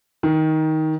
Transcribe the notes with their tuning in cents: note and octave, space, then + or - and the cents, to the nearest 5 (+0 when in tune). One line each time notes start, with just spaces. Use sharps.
D#3 +15